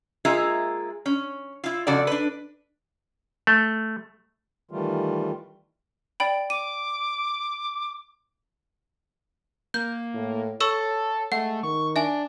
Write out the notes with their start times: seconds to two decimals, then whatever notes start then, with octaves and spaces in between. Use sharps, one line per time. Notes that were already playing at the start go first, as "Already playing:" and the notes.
0.25 G#3 A#3 F4 G#4 E5 A#5
1.06 C#4
1.64 E4 F4
1.87 F2 C#3 F#4 A4 D5
2.07 D4 B4
3.47 A3
4.71 D#3 E3 G3 A3 F4
6.20 D5 G5 B5
6.50 D6 D#7
9.74 A#3 G6
10.14 A2
10.60 A4 C#5 C#6 E6 E7
11.32 G#3 A3 F#5
11.63 D#3 C#6
11.96 D4 E5 G#5